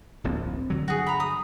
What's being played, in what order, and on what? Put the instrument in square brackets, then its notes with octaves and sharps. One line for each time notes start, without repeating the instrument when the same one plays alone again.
[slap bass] D1 A#1 C4
G2 D3 F#3
[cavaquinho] F#4 G#4
A#5 B5
D#6